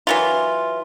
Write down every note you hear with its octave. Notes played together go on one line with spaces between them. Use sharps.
E3 F#3 F4